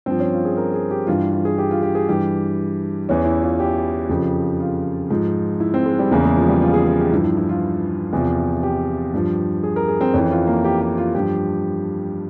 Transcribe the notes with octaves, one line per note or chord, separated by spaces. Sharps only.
G2 F3 C4
C#4
F4
G#4
A#4
G#4
G4
G2 E3 F4
F4
G#4
G4
F4
G4
G#4
G2 E3 G4
E2 E3 C#4
E4
F4
G4
F2 C#3 F3
F4
G#2 F3
E4
C4
G#3
G3
E2 C#3 E3 A#3
G#3
F3
G3
F4
G#4
G#4
G4
G2 F3 E4
E4
E4
F4
E2 C3 F3
G4
G2 F3
G#4
A#4
G#4
C4
F2 E3 C#4
F4
A#3
G4
G4
F4
G2 F3 G4